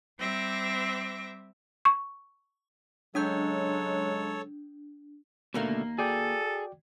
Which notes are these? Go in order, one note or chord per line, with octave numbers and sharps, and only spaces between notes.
G3 C4 E5 D6 A#6
C#6
C#3 F#3 G#3 D4 A4 C#5 D#6 G6
D#2 B2 D3 A3 A#3 F5
F#4 G#4 A4 D5 G5